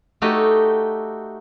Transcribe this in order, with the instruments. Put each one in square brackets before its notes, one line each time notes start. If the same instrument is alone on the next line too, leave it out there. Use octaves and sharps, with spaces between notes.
[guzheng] A3 D#4 F#4 G4 A4 D#5